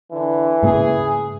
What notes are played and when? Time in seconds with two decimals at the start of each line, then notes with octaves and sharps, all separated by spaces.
0.12 D3 E3
0.63 G#2 C#3 A#3 G#4